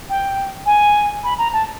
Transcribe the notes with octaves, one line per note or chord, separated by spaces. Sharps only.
G5
G#5
B5
A#5
A5